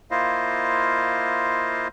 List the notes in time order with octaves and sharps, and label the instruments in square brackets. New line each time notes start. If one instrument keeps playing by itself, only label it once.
[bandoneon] A#3 E4 F4 C5 D#5 F5